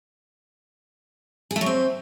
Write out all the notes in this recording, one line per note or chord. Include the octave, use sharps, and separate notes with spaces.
G#4
A3
F#3
C4